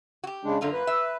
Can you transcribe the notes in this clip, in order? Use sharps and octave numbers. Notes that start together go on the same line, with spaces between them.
F#4 G4
C#3 G#3 D4
F#2 D3 A#3 F4
B4
E5